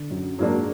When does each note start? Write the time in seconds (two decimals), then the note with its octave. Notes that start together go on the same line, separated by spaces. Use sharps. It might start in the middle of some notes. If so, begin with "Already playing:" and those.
Already playing: D3
0.10 F#2 F#3
0.38 G#2 F#3 G#3 A#3 D4